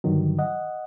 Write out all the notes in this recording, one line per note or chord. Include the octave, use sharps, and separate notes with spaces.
G2 D3 D#3 F#3
D#5 F#5